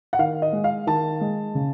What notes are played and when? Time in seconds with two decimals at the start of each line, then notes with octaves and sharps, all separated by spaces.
0.13 F#5
0.19 D#3 F5
0.42 D#5
0.53 G#3
0.64 F5
0.87 D#3 A5
1.21 G#3
1.55 C#3